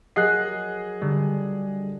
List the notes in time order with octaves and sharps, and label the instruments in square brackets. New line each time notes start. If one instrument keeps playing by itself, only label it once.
[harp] F#3 A#4 [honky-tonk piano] G#4 D#5 C7 [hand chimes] F#5 F#6
[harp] D3 [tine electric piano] G3